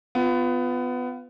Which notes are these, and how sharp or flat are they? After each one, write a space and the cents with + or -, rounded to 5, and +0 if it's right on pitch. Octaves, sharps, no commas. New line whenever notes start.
B3 +20 F4 +0